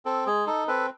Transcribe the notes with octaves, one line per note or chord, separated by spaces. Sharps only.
C4 A4
G#3 G#4
D#4 A4
C4 A4 B4